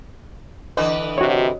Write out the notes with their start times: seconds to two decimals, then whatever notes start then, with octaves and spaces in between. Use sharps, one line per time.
0.77 D3 E3 B4 D#5
1.18 C3 F#4 C#5